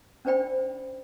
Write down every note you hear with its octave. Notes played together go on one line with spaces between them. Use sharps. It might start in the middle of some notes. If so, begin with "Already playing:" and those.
C#4 D4 C5 D5 G5 B5